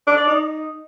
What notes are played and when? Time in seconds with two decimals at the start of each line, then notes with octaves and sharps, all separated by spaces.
0.07 D4
0.17 D5
0.27 D#4